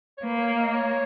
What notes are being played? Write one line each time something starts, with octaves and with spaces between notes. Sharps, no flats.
C#5
A#3 B4
B4
C#5
D#5
C#5